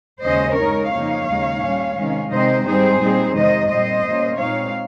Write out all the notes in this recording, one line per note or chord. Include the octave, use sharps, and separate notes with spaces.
D#2 C#3 G#3 C#4 C5 D#5
C#3 G#3 D#4 A#4 C#5
F2 C#3 F3 A#3 D#4 C#5 F5
D#2 C#3 G#3 D#4
A#2 G3 C#4
C3 D#3 G#3 C#4
C3 D#3 G#3 C4 D#4 C5 D#5
G#2 G3 C4 D#4 G#4 C5
A#2 G3 C4 D#4
F2 C3 D#3 G#3 C5 D#5
A#2 G3 C4 C5 D#5
A#2 G3 A#3 C#4
A#2 G#3 C4 D#4 C#5 F5